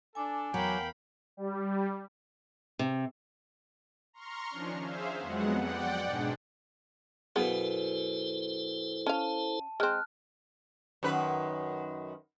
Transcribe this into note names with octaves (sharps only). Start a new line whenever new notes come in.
D4 A4 G#5 D6
E2 F#3 A#4 F5 G5 B5
G3
C3
A#5 C6 C#6 F6
D#3 F3 C#4 D4
G#4 C5 E5 F5
F2 F#3 G#3 B3 F#5
D5 F#5 G5
G#2 B2 G#3 D4
F#2 B2 B3 E4 G#4 A4 C5 F5
C#4 F5 A5
G#3 C4 F6 F#6
F#2 D#3 B4